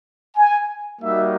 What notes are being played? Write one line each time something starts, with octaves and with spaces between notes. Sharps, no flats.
G#5
G3 A#3 D#4 F#4 E5